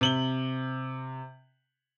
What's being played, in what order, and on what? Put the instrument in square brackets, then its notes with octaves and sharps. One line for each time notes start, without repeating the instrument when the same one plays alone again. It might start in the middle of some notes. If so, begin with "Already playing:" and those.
[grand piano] C3 F#7 G7